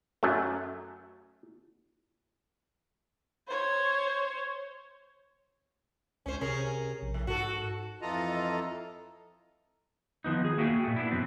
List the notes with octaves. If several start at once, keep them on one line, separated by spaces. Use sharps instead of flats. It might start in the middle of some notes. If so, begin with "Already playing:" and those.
F#2 F#3 A3
C5 C#5
C#2 C#4 C5
C3 C#4 G#4 A#4
A#1
A2
G#2 F#4 A4
F2 E3 F4 A4 D#5 A#5
D#3 F3 B3 D#4
G#4
A#3 F#4 G#4 E5 G5
A#2 A3
B3 D4 E4
F#2 B2 E3 C4